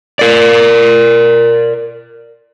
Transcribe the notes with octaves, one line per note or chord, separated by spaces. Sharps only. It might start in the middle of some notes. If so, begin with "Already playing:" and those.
A#4 D5